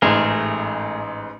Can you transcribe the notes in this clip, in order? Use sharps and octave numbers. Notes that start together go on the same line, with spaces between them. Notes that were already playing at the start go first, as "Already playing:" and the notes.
A1 G#2 A3 G#4 A#4